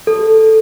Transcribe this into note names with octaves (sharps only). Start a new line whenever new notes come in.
A4